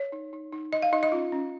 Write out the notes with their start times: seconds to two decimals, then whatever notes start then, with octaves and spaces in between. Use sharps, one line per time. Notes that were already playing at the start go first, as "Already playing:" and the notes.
Already playing: C#5
0.12 D#4
0.33 D#4
0.53 D#4
0.72 D#4 D#5
0.82 F5
0.92 D#4 D#5
1.03 D#5
1.12 C#4 F4
1.32 C#4